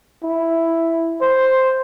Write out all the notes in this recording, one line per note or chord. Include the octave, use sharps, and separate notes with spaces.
E4
C5